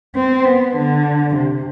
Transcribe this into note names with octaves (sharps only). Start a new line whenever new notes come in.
C4
B3
D3
C3